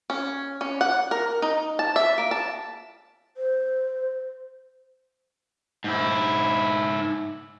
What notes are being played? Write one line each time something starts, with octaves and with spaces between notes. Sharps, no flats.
C#4
C#4
F#5
A#4
D#4
A5
E5
A#3
A5
C5
G#2 E4